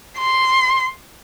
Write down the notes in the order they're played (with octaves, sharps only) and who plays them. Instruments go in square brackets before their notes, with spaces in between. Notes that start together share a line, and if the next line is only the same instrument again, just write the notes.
[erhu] C6